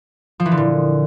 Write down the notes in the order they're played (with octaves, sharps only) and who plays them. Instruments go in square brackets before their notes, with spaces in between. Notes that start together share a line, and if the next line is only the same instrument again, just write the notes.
[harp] F3
E3
D3
A#2